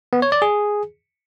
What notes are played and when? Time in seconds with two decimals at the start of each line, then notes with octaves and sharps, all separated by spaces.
0.13 B3
0.22 C#5
0.32 D5
0.42 G#4